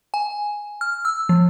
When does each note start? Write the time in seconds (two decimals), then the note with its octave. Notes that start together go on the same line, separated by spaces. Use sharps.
0.14 G#5
0.81 F6
1.05 E6
1.29 F3